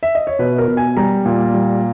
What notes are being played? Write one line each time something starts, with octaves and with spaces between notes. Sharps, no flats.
E5
D#5
C#5
B2 B4
A#4
B2
G#5
G3 A#5
A#2
G3